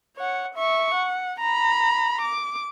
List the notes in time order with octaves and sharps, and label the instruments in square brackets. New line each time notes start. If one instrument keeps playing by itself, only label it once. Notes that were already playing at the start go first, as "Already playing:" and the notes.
[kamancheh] C#5 F#5
E5 C#6
F#5
A#5 B5
D6